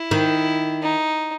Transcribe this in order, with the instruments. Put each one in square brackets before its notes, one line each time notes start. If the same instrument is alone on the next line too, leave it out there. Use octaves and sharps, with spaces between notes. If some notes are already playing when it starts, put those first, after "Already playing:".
Already playing: [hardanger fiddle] E4
[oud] D#3
[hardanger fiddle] D#4